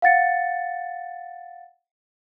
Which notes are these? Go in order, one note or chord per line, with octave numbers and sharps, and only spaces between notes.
F5 F#5 A6 C#7